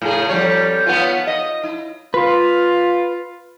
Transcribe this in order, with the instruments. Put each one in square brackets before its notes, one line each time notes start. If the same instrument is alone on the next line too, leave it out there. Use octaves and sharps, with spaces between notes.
[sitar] A2 C#3 G#4
F2 G3 C#5
B3 C#4 F4
B3
D#5
E4
[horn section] F4 [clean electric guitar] B4